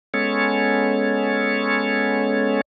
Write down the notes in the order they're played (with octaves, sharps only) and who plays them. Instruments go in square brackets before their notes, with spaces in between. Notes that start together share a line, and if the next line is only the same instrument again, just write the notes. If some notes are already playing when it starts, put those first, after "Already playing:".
[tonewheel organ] G#3 B3 C#4 A4 C#5